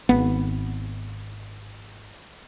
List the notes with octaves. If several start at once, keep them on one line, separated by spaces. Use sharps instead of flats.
G#1 B3